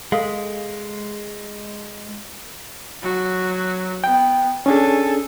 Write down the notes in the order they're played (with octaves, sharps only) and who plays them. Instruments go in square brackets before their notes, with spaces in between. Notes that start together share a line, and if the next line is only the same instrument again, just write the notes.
[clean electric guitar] G#3 [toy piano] A4 F5
[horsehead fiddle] F#3 F#4
[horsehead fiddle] B3 [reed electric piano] G5
[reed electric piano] C#4 D4 G#4 [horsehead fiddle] A4 G#5